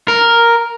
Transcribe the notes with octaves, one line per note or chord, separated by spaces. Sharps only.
A#4